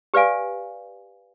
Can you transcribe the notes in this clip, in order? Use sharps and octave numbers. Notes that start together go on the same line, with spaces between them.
G4 B4 D5 F5 G#5